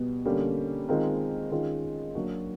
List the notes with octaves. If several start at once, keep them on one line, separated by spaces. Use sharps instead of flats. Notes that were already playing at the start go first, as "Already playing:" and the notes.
Already playing: B2 G3 B3
D3 G3 A#3 C#4
D#3 G#3 C4 F4 A#4
D#3 G#3 C#4 F4
F#3 A#3 D4 F#4